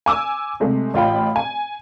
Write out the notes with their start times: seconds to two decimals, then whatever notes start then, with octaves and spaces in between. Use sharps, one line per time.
0.06 G#5 D6 E6
0.60 C3 G#3 A3
0.94 A1 F4 G5 B5
1.36 G#5